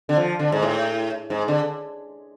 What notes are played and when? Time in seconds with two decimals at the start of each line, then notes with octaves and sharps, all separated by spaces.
0.09 D3
0.17 F3
0.39 D3
0.52 G#2
0.62 A2
1.30 G#2
1.48 D3